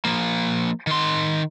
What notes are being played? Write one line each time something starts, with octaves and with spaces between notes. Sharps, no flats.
F3 A#3
D#3 C6